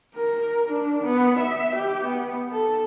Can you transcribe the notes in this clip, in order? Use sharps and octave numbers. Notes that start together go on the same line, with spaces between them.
A#4
D4
B3
E5
G4
B3
A4